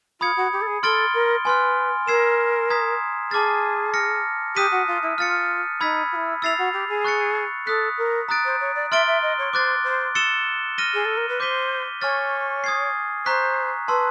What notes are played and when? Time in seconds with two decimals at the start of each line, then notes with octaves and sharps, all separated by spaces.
0.20 F4 B5 D#6 G#6 C#7
0.36 F#4
0.52 G4
0.61 A4
0.67 G#4
0.83 A4 C6 F6 A6 D7 G7
1.14 A#4
1.45 B4 G#5 C6 F6
2.07 A#4 E6 G#6 C7 E7
2.70 A#5 D#6 G#6 B6
3.31 G#4 A5 D6 F6 A6
3.94 F6 A#6 C#7
4.56 G4 D#6 F#6 B6 D#7
4.71 F#4
4.87 F4
5.02 E4
5.18 F4 F6 A6 C#7
5.81 D#4 B5 E6 G#6 B6
6.12 F4
6.15 E4
6.42 E4 E6 A6 C7 F7
6.58 F#4
6.73 G4
6.88 G#4
7.04 C#6 F#6 A6 C#7
7.67 A4 D#6 F#6 B6
7.97 A#4
8.29 A#5 D#6 F#6 A6 D7
8.45 C5
8.60 C#5
8.75 D5
8.91 E5 C6 F6 A6 D7 G7
9.07 E5
9.22 D#5
9.38 C#5
9.53 C5 D6 F#6 A6
9.84 C5
10.15 E6 A6 C#7 E7 G7
10.78 F6 A#6 D#7 G7
10.94 G#4
11.05 A4
11.17 A#4
11.28 B4
11.40 C5 D6 G6 B6 D#7 G7
12.02 C#5 G#5 C#6 F6 A6
12.64 D#6 G#6 C7
13.26 C5 A#5 C#6 F#6 B6
13.88 B4 A5 C6 E6